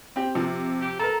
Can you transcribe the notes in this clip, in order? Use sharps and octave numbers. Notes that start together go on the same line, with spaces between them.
C4 G4
C3 F3
G4
A4 A#4 A#5